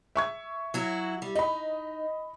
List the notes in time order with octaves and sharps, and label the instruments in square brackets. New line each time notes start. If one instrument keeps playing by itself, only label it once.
[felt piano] E5 C#6 G#6
[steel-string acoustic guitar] F#3 E4 F#4
G3
[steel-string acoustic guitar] D#4 [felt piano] D#5 B5